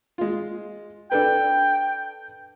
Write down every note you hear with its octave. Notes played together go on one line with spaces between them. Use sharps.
G#3 F4
D4 A4 B4 G5